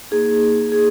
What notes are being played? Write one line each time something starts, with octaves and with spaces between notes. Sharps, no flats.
A#3 D#4 G#4
G#4